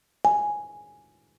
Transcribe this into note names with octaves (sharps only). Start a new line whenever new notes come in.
G#5